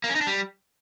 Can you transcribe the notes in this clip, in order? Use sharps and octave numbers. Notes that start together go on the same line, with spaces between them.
A#3
C#4
D#4
D4
G3